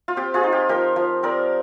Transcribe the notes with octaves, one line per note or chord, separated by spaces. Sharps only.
F4
C4 G4
F4 G#4
D#4
G4
F3 G4 A#4
F3
C4 A#4 D5